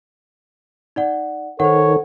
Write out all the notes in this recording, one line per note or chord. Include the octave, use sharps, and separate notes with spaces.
D#4 D5 F#5
D#3 A4 C5 C#5 F#5